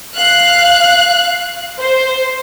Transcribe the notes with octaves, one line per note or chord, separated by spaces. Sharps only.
F5 F#6
C5